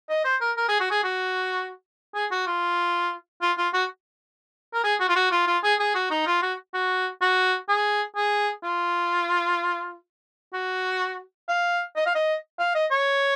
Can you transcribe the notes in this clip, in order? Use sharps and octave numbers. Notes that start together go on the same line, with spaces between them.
D#5
C5
A#4
A#4
G#4
F#4
G#4
F#4
G#4
F#4
F4
F4
F4
F#4
A#4
G#4
F#4
F4
F#4
F4
F4
G#4
G#4
F#4
D#4
F4
F#4
F#4
F#4
G#4
G#4
F4
F#4
F5
D#5
F5
D#5
F5
D#5
C#5